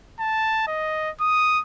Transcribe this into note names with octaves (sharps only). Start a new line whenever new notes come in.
A5
D#5
D#6